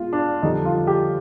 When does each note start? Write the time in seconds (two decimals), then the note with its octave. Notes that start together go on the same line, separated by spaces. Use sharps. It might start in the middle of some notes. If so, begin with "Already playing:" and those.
Already playing: B2 G#3 F4
0.13 D4
0.42 F2 D3 G3 D#4
0.65 F4
0.87 G4